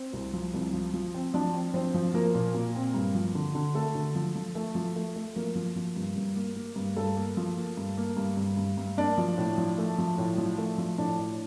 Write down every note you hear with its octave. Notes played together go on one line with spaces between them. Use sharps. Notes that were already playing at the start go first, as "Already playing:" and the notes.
Already playing: C4 C5
C2
F3
C2
F3
F3
C4
F3 D4 D5
C4
F3 C4 C5
F3
F3 A#3 A#4
A#2
A#2
C4
G2
F3
D3
D3
A3 A4
D3
F3
F3
A3
F3
A3
A3
F3 A#3 A#4
F3
F3
G2
G2
A#3
A#3
G2
G2 A4
A#3
F3
A#3
G2
A#3
G2
G2
G2
G2
A#3 D4 D5
F3
A2
F3
A3
F3
A2
F3
A3
F3
A2 D4 D5
A2